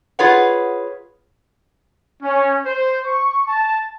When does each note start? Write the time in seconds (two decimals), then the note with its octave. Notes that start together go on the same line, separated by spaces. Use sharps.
0.19 F4 G#4 B4 C#5 F#5
2.23 C#4
2.66 C5
3.05 C#6
3.48 A5